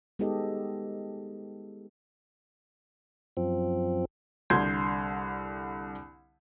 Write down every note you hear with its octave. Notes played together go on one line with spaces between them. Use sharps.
G#3 B3 D#4 G4 A4 D#5
F#2 F3 C4
C2 D3 C6 G6 G#6 C7